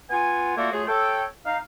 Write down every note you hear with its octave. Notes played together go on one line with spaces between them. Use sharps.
B3 F4 F#5 G#5
A3 A#3 F4 F#4 A4 D5
F#3 A3 F4 G#4
A4 C#5 G5
D#4 F5